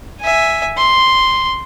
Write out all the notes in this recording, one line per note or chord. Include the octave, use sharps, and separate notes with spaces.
E5 G#5
C6